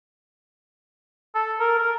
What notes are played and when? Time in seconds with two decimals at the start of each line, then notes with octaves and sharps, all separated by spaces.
1.35 A4
1.60 A#4
1.78 A#4